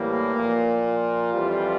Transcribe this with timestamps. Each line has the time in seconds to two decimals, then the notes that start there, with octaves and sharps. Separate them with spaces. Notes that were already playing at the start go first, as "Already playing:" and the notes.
Already playing: A2 E3 G3 A#3
0.36 A#2 F3
0.84 F4
1.34 F2 E3 G3